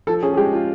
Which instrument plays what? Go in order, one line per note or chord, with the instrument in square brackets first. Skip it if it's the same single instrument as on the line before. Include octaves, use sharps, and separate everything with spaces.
[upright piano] F3 [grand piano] A4
[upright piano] C#4 [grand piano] G#4
[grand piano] G#4
[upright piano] G#3 [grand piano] G4
[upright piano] F4